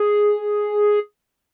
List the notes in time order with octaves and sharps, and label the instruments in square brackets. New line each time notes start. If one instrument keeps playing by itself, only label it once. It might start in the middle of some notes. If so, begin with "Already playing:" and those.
Already playing: [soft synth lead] G#4